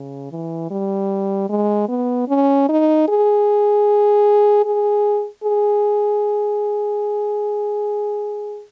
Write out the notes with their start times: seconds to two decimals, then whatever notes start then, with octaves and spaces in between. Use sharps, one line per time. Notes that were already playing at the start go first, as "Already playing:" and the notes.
Already playing: C#3
0.31 E3
0.71 G3
1.49 G#3
1.88 B3
2.28 C#4
2.69 D#4
3.08 G#4
4.65 G#4
5.44 G#4